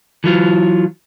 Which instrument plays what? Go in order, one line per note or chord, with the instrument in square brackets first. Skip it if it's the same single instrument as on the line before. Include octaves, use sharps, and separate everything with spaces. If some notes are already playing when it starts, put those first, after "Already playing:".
[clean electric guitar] E3 F#3 F4